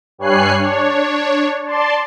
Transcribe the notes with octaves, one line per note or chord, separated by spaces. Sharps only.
G2 G3 C#5 G#5 F#6 C7
D4 C#5
D5 A5 C6